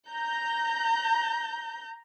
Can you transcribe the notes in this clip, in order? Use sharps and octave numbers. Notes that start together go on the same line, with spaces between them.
A#5 G6